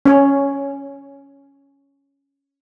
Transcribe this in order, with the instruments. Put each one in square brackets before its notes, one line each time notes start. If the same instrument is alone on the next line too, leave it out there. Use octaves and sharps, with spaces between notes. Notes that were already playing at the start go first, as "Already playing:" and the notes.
[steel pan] C#4 C#5